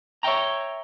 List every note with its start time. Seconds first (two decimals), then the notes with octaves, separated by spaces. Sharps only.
0.23 C#5 E5 F5 G5 A#5